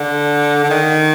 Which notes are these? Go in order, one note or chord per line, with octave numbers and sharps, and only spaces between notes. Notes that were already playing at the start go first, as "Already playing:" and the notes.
Already playing: D3
D3
D#3